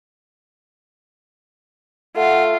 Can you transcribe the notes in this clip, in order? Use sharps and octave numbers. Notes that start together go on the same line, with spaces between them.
A3 F4 F#5